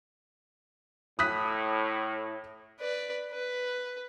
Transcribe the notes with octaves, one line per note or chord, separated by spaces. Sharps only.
A2 D#6 F#6 B6
B4 D5
B4